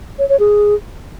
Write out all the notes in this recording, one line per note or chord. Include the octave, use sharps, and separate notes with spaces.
C#5
C#5
G#4